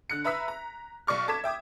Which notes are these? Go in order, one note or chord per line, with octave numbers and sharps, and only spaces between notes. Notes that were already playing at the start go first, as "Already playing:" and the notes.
D3 F#6 C#7
B4 E5 A#5 B5 E6 B6
A#5
B1 D5 C#6 F6
A4 D6 G#6 B6 E7
E5 G5 D6 D#6